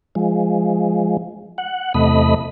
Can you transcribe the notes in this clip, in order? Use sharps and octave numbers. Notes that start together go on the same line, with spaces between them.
F3 G#3
F#5
E2 C3 A3 D#5 B5